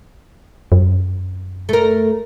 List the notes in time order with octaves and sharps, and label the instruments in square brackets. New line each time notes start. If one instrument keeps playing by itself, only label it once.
[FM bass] F#2
[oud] A3 A#4